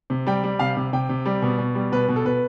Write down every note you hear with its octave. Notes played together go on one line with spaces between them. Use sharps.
C3
G3 G5
G3
C3 F5
C3
C3 G5
C3
G3
B2
B2
G3
B2 B4
B2
A4
B2 B4